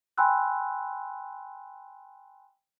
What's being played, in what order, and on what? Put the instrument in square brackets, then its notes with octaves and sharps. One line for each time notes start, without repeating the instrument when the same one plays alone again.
[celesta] G5 G#5 B5 C6 E6 F#6